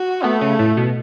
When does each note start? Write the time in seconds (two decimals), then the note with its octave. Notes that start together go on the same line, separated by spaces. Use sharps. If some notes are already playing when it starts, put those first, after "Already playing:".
Already playing: F#4
0.24 A3 B3
0.41 C#3
0.59 A2
0.77 B2